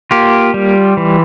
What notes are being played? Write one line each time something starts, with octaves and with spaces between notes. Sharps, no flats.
A#3 F4 G4
G3
E3